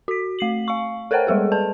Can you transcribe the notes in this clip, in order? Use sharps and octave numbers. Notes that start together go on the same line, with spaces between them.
F#4 B6
A3 C7 F#7
F5 C#6
A4 A#4 C5 C#5 F#5 G5
G3 G#3 G#4 A4
B4 A5